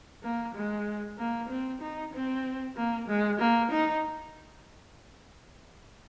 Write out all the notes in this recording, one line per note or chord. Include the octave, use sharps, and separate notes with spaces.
A#3
G#3
A#3
C4
D#4
C4
A#3
G#3
A#3
D#4